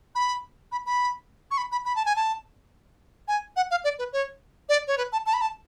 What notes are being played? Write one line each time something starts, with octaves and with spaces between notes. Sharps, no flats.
B5
B5
B5
C#6
B5
B5
B5
A5
G#5
A5
G#5
F#5
F5
D5
B4
C#5
D5
C#5
B4
A5
A5
B5
A5